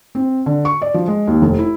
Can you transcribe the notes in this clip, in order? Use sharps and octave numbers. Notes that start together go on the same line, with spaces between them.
C4
D3
C#6
D5
F3
G#3
D#2
F1
E4